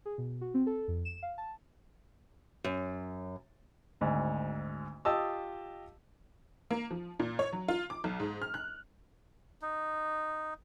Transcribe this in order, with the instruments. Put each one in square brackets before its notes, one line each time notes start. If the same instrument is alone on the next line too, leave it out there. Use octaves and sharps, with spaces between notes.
[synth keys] G#4
B2
F#4
C4
A4
F2
E7
F5
A5
[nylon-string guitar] F#2
[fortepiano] G#1 D2 G#2
F4 G4 D#5 A5 D#6 E6
[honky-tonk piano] A#3
F3
A#2
C#5
F#3
F4
D6
B1
G#2
F6
F#6
[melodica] D#4